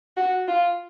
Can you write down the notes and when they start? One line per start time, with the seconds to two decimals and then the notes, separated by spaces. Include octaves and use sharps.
0.17 F#4
0.48 F4